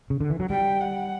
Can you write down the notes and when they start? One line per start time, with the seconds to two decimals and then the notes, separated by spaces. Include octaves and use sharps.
0.10 C#3
0.20 D3
0.30 E3
0.40 F#3
0.50 G3 G5
0.81 F#5